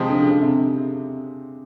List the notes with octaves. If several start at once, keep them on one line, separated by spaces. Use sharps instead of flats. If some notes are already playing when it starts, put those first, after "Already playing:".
Already playing: C3 F3 G#3
D3
C#3
C3